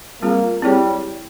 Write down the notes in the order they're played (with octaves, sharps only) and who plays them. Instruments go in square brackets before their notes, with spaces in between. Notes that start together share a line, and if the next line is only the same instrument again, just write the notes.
[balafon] G3 C4 F4 G#4 [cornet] A#3
[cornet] G3 [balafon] C4 E4 G#4 C#5